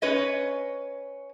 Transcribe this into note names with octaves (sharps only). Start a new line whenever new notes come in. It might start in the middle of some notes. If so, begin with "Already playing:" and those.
C#4 B4 C#5 D#5